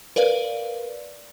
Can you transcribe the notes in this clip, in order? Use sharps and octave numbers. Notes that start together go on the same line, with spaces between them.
A#4 B4 D5 F5